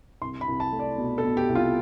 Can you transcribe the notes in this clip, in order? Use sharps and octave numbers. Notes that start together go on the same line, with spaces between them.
C2 C6
B5
C2
A5
A3
D5
B2
A4
B2
G4
C2
F4